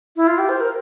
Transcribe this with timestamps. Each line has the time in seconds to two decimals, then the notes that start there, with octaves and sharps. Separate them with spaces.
0.16 E4
0.27 F4
0.38 G4
0.49 C5
0.60 A#4